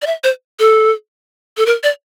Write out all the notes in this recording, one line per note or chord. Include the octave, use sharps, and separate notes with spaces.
D5
E5
C5
A4
A4
A#4
D5